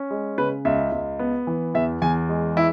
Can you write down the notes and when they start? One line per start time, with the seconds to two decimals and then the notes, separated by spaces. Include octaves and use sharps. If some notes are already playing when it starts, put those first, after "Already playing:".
Already playing: C#4
0.10 G#3
0.38 C#3 B4
0.65 C#2 E5
0.92 C#2
1.19 B3
1.47 E3
1.75 E2 E5
2.02 E2 G#5
2.29 G#3
2.56 E3 E4